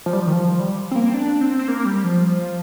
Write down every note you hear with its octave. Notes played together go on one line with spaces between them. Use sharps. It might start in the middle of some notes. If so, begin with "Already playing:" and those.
F3
G3
F3
D#3
F3
G3
C4
A#3
C4
D4
C4
C4
A#3
G3
F3